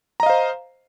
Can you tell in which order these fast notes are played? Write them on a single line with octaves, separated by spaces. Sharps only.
A#5 D#5 F5 C5